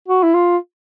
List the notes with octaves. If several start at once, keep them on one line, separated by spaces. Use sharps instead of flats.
F#4
E4
F4